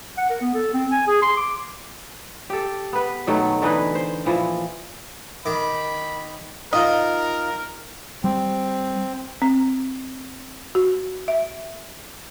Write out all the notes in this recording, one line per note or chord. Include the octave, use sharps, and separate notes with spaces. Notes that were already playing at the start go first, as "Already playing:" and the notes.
F#5
A#4
B3
A4
C4
G#5
G#4
C6
D6
G4 A4
B3 B4
B2 D#3 F#3 A3
D3 E3 D#4 B4
C5
A#2 E3 F3
D#3 B5 D6
D#4 F4 A#4 D#5
G3 C4
C4
F#4
E5